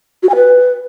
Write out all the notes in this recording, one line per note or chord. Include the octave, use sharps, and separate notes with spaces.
F#4
G#5
B4